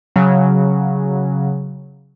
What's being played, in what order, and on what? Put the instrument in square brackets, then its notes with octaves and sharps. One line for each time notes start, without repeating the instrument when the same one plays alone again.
[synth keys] C#3 F#3